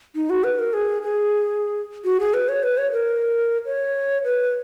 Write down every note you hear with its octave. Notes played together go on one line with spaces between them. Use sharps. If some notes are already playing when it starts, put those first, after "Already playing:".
D#4
F#4
B4
A#4
G#4
G#4
F#4
G#4
B4
C#5
B4
C#5
A#4
C#5
B4